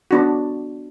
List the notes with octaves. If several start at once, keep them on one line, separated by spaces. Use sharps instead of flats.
B3 D4 F#4